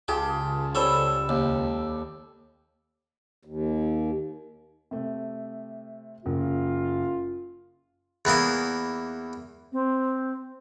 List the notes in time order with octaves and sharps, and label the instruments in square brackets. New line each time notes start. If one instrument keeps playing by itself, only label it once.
[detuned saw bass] C#2 [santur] F4 G#4 A5 [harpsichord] G4
[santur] G3 A4 E6 [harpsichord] C5 C#5
[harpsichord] D#2 [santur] G4
[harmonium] D#2
[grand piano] C3 A3
[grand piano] F#1 [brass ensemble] F4
[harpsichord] E2 E3 A#3 D#6
[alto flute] C4